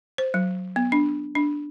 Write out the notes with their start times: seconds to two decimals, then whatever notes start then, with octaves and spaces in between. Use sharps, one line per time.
0.18 C5
0.34 F#3
0.76 B3
0.92 D4
1.35 D4